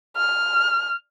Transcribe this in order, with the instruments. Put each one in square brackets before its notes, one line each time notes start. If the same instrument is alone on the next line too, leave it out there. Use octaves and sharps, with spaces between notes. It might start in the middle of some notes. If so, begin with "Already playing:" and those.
[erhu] F6